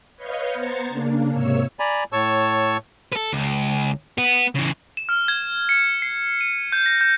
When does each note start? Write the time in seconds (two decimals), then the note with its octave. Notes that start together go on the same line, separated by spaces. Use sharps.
0.16 B4 C#5 D#5 F5 C#6 G6
0.54 B3 C5 A#5 G#6 A6 C#7
0.88 C#3 A#3 D4
1.31 G#2 C3 A#3 C#5 E6
1.79 D5 G#5 A#5 B5
2.13 A2 C#5 A5 C#6 E6
3.13 A4 B4
3.33 C#2
4.18 B3
4.55 C#3 E3
4.97 E7
5.09 F6
5.28 G#6
5.69 C#7
6.02 C7
6.41 D#7
6.72 G6
6.86 A#6
7.01 G6